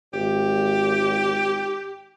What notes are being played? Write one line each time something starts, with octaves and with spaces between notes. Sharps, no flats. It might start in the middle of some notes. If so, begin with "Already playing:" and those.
G#1 G4